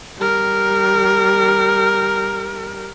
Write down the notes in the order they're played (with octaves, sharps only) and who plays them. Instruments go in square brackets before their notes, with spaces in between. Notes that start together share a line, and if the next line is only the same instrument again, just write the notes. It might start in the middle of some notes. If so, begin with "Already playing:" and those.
[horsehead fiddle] G3 A#4